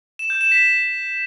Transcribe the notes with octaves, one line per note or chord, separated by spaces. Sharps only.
E7
G6
E7
B6